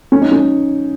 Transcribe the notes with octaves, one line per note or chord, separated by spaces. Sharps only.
C#4
D#4
C#4